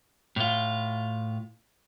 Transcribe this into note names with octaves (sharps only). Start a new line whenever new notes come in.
A2 F4